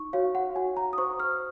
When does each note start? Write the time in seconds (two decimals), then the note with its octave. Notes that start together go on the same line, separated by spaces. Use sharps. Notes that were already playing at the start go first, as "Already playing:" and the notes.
Already playing: D#4 C#6
0.13 F#4 C#5 F5
0.35 F#5
0.56 F#4 G#5
0.77 A#5
0.93 D#6
0.98 C5 C#6
1.20 F6